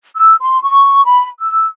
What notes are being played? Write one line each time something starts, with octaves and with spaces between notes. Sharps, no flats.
E6
C6
C#6
B5
E6